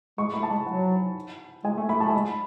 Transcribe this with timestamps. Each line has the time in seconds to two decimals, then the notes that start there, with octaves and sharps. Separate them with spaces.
0.18 G#3 C#6
0.34 A3 B5
0.43 A5
0.50 G#3 G#5
0.66 F#3 F#5
1.64 G#3 G#5
1.77 A3
1.89 A3 B5
2.00 A3 A5
2.10 G#3 B5